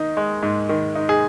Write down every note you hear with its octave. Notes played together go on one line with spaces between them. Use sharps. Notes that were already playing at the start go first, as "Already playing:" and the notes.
Already playing: D#3 D#4
G#3
G#2
D#3
D#4
G#4